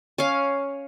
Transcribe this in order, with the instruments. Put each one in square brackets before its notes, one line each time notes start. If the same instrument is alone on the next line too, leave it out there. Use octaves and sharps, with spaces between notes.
[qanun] C#4 F5